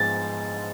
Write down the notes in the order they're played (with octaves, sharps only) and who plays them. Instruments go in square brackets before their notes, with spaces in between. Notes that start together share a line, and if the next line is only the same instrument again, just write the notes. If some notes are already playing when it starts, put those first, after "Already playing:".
Already playing: [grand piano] G#2 F3 G#3 B3 A6